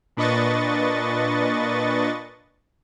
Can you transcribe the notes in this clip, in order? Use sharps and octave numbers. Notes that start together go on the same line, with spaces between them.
A#2 D4 B4 D#5 C#6 A6